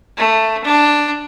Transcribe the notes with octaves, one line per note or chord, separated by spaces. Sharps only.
A3
D4